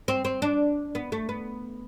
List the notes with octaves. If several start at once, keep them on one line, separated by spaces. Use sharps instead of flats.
C4
C4
D4
B3
A3
B3